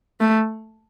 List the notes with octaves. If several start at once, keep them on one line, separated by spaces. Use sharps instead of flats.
A3